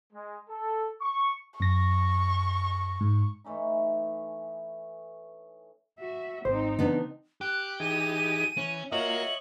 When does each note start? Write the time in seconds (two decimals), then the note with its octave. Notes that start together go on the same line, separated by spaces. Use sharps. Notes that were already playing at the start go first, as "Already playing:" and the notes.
0.11 G#3
0.48 A4
1.00 C#6
1.60 F#2 C#6 A#6
3.01 G#2
3.44 E3 A3 C#4 D#4
5.99 F#4 E5
6.45 G#1 C4 D#4 C5
6.79 C#3 E3 B3 D4
7.41 G4 F#6
7.80 E3 D#4 G#4 D#7
8.58 E3 C#4
8.92 A#3 F4 F#4 A#4 C#5 D#5 E5 F#7